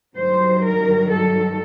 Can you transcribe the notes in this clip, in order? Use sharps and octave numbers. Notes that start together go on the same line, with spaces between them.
G2 D#3 F#3 C5
A#4
A4